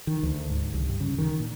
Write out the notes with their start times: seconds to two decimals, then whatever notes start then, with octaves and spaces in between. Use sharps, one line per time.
0.07 D#3
0.23 D2
0.49 G#2
0.74 C2
0.89 G2
1.00 C#3
1.18 D#3
1.40 A#2